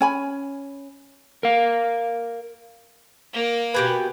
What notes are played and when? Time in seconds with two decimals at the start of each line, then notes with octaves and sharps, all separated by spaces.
0.01 C#4 G#5 B5
1.43 A#4 F5
3.33 A#3 A#4
3.74 B2 G4 B4 G#5